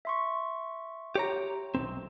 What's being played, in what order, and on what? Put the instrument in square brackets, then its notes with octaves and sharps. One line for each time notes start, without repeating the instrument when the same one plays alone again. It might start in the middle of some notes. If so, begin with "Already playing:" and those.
[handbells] E5 C6 C#6
[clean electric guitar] G4 C#5 A#5
B1 C#3 C4